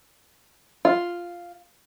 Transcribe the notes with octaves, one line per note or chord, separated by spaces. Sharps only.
F4